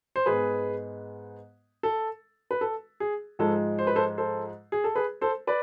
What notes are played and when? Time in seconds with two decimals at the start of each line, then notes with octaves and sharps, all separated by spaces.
0.16 C5
0.26 G#2 G#3 B3 G#4 B4
1.83 A4
2.51 B4
2.61 A4
3.00 G#4
3.39 G#2 F3 G#3 A4
3.79 C5
3.87 B4
3.96 A4 C5
4.18 A4 C5
4.72 G#4
4.84 A4
4.96 G#4 B4
5.21 A4 C5
5.47 B4 D5